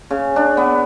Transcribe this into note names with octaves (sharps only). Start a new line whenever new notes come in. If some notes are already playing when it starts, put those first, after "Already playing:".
C#3
D4
B3